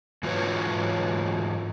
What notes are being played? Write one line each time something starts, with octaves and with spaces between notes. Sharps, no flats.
G#2 E3 F4 F#4 B4 C#5